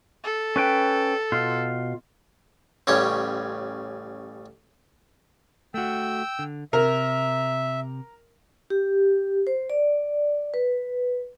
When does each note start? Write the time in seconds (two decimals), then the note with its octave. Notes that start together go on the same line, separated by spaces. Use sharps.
0.24 A4
0.56 C#4 B4 G5
1.32 B2 F4
2.87 A1 C#3 G3 C#5
5.74 A3 F#4 G5 E6
6.39 D3
6.73 C3 A#4 E5
8.70 G4
9.47 C5
9.70 D5
10.54 B4